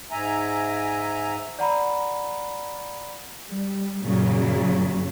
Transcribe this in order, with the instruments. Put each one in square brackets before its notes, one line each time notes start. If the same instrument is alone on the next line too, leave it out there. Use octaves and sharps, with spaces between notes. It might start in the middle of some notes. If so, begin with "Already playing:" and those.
[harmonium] G#2 E5 G#5 A#5
[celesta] D5 F#5 A#5 B5
[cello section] G3
F#2 A#2 C#3 F#3